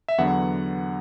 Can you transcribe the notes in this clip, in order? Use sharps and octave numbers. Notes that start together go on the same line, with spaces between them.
E5
E2 D3 F#3 B3 F#5